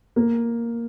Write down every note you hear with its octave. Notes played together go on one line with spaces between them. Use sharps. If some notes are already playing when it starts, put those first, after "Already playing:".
A#3